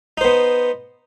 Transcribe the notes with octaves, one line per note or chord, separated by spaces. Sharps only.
B3 D#4 C5